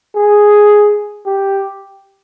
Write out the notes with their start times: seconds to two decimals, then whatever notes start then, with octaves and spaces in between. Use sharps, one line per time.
0.16 G#4
1.26 G4